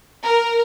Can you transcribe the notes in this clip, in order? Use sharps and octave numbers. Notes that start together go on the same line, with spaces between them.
A#4